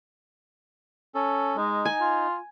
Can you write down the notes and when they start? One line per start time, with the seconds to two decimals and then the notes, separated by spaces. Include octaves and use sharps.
1.15 C#4 A4
1.57 G#3 D#4
1.85 G#5
2.01 F4